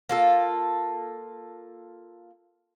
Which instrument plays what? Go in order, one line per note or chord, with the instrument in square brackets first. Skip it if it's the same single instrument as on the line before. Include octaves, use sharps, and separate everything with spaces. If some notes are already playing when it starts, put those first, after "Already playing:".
[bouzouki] A#3 F4 A4